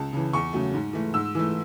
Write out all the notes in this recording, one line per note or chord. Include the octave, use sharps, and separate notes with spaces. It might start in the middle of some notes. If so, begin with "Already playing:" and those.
Already playing: C#2 A5
C#3 E3
E2 C#6
C#3 F#3 A3
G#2
E3 A3
G#2 E6
E3 A3